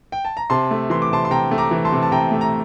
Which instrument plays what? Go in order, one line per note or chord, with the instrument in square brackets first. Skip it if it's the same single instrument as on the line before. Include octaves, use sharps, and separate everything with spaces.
[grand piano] G5
A5
A#5
C3 A5 C6
A3
E3 C6
D6
C3 A5 C6
C6
C3 G5 A#5
A3
A#5 D6
E3
A5 C6
C3
A5
C3 G5 A#5
A3
A#5